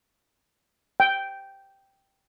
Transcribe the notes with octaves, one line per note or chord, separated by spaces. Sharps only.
G5